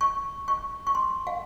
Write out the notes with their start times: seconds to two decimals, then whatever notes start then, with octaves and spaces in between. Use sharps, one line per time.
0.01 C#6
0.48 C#6
0.87 C#6
0.95 C6
1.27 F5